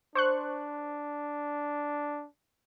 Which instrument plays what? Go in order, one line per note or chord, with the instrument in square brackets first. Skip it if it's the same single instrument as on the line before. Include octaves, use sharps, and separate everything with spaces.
[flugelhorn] D4 [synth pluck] C5 C#6 F#6